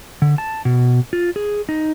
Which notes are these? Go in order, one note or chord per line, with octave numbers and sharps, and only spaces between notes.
D3
A5
B2
F4
G#4
D#4